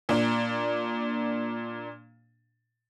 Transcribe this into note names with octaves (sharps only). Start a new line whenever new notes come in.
A#2 D4